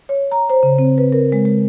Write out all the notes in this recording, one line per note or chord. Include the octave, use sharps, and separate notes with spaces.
C#5
A#5
C5
C#3
C4
B4
A#4
G#3
G#3